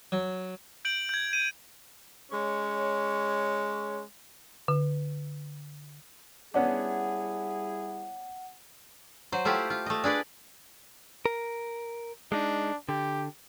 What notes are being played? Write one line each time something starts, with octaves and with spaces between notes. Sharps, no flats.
F#3
G6 D7 F#7
G6 G#6
D#7
G#3 C#4 C#5
D3
G3 B3 C#4 D4 E4 G#4 F#5
F#3 C5
A3 E4 F4 G4
F4
A3 D#5
D4 G#4 B4 D5
A#4
G#3 D4 D#4
D3 G4